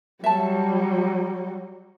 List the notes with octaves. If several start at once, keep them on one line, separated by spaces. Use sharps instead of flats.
F#3 G3 E5 A5